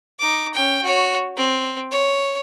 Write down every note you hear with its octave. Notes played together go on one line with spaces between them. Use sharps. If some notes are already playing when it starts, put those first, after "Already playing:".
D#4 D6
C#4 G5
F#4 C#5
C4
C#5